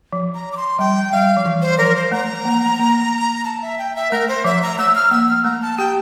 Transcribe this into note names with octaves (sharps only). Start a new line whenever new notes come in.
F3
A#5
D6
C6
G3 G5
G3 F5
F3
E3
C5
F3 A#4
C5
A3 A#5
A#3
A#3
A5
E5
G5
E5
A3 A#4
C5
F3 E5
A#5
A3 E6
F6
A#3 E6
F6
A3 A#5
A5
G4 G5